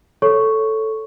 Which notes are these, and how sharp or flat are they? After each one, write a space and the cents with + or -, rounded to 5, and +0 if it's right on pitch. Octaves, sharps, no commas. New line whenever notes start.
A4 +0 C#5 +0 C#6 +0